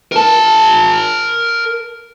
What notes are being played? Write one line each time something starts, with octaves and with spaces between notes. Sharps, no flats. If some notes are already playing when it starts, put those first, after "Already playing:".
A#4 A5